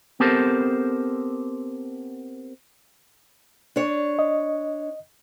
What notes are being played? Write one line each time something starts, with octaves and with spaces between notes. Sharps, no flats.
B3 C4 G4 A4 A#4 C5
D4 C#5
D#5